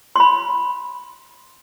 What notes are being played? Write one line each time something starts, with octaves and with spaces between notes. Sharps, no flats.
B5 C6